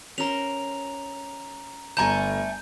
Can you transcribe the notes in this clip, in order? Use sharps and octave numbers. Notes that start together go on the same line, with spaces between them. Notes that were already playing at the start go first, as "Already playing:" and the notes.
C#4 A#4 C5 A#5 F7
G1 A3 G#5 A#5 G6 E7